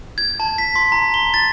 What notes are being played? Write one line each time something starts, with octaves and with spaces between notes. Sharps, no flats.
G#6
A5
B6
C6
A#5
G7
A6